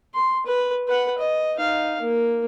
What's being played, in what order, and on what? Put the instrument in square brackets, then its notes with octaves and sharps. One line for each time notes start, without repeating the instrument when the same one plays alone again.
[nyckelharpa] C6
B4
B4 F#5
D#5
D#4 F5
A#3